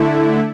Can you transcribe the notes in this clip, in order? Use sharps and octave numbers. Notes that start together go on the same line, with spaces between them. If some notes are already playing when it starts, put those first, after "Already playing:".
Already playing: D3 A3 E4